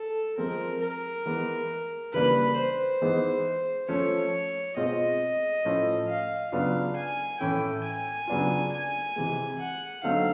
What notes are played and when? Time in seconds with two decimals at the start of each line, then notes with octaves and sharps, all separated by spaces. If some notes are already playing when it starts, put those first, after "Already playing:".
Already playing: A4
0.37 F3 G#3 C4 A#4
0.82 A#4
1.26 E3 G#3 B3
2.13 C#3 E3 G3 A#3 D4 B4
2.57 C5
3.02 E3 G#3 B3 D#4
3.89 F3 A3 C#4 F4 C#5
4.77 B2 G#3 C4 F4 D#5
5.65 A2 F3 A3 C#4 F4
6.08 F5
6.52 C#3 F#3 B3 D4 F4 F5
6.96 G#5
7.40 A2 E3 A3 C#4 E4 G5
7.84 G#5
8.27 C#3 F#3 B3 D4 F4
8.72 G#5
9.16 C3 E3 G#3
9.59 F#5
10.03 D3 F#3 A3 C4 D#4 F5